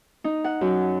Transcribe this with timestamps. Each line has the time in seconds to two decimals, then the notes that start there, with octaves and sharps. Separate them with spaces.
0.24 D#4
0.44 F#5
0.61 F#2